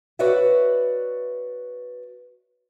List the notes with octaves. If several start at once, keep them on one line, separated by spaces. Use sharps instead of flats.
F#4 B4 C#5 D5 E5